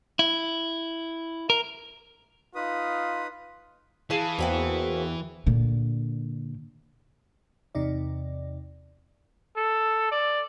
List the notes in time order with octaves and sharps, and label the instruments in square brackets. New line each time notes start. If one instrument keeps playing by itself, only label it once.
[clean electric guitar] E4
A#4
[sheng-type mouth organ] D#4 B4 D#6 [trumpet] F4
[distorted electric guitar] E3 [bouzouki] G#4 F5 A5
[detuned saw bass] E2 [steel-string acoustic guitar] A#3 C4 F#4
[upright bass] A#2 D3
[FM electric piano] E2 C3 D#4 D5
[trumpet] A4
D5